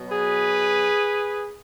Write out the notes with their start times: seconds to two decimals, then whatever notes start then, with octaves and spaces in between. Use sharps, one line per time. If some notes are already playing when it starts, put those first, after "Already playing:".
Already playing: B2 F#3
0.10 G#4 B4